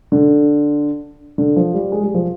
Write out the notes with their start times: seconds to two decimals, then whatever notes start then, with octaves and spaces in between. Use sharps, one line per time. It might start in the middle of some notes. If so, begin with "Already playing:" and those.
0.12 D3
1.38 D3
1.56 F3
1.74 G3
1.92 G#3
2.03 G3
2.14 F3